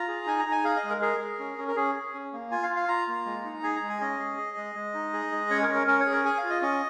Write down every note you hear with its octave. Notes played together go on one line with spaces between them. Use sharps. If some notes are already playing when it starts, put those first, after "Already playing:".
Already playing: F4 A#5
G#4
D#4 G#5
A#5
D#4
G#5
G#4 F5
D#5
G#3
A#4
G#4 A#4
G#4
C#4
C#4
A#4
C#4 G#4
G#4
C#4
A#3
F4 G#5
F5
F4
F5
F4 A#5
A#3
G#3
D#4
G#4 G#5
A#5
G#3
G#5
C#4 D#5
G#4
G#4
G#3
G#3
D#4
G#4
G#3
C#4 C#5
A#4
C#4
A#4
C#4 A#4
C#5
G#4
A#4
G#4 G#5
F5
F4
D#5
C#4 D#5